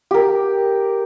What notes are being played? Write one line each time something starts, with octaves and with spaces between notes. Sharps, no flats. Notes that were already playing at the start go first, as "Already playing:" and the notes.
G4 A#4